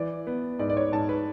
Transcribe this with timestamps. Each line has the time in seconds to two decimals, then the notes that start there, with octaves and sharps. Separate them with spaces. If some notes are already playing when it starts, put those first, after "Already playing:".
Already playing: E3 D5
0.27 B3
0.59 G#2 D5
0.70 D5
0.77 C#5
0.92 G#2 A5
1.09 B4